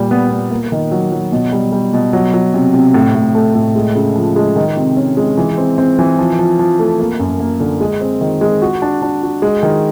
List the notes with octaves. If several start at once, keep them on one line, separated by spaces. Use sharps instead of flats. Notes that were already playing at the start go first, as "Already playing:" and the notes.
Already playing: A#2 G3
B3
B3
A#3
D#3
F#3
F#3
B2
G3
G3
B2
F#3
F#3
C3
C3
A2
A2
A3
A2
G#3
C#3
F3
G#3
D#3
C3
C#4
G#3
E3
C4
C4
E3
F3
F3
F3
A3
A#3
F#2
A#3
D3
G#3
C4
D#3
G#3
F#4
D4
D4
F#4
G#3
D#3